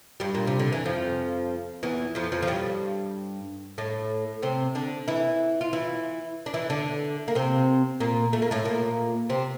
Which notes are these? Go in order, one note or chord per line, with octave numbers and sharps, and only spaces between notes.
G2 G3
A#2
C3
D3
E3
F2 F3
E2 E3
F2 F3
F2 F3
F3
G2 G3
A2 A3
C3 C4
D3 D4
E3 E4
F4
E3 E4
D4
E3 E4
D3 D4
A#3
C3 C4
A#2 A#3
A3
A#3
A2 A3
A#2 A#3
C3 C4